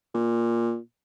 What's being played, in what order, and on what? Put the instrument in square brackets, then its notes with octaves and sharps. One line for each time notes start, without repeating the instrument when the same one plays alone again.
[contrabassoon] A#2